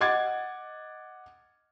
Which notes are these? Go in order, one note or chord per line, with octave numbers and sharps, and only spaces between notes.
D#5 F#5 D6 G#6 A6